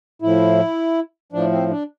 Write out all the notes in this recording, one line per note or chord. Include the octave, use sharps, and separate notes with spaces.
A2 F3 E4
A2 F3 D4
C4
D4